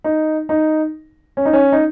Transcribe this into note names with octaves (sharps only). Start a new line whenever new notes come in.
D#4
D#4
C#4
D#4
C#4
D#4